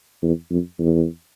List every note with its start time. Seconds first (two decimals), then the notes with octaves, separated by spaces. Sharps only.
0.22 E2
0.50 F2
0.79 E2